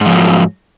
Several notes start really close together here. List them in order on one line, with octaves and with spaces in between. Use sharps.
G#2 F3 F#3